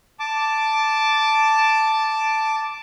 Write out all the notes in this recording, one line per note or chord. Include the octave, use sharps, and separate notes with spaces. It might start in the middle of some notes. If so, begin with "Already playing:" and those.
A5 D6